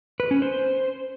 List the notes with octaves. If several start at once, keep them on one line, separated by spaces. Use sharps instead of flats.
B4
C#4
C5